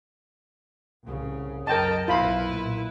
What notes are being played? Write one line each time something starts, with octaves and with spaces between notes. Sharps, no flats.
C2 C#3
F#2 A#4 D#5 G5 A5
B1 B2 E4 F4 B4 B5
A#2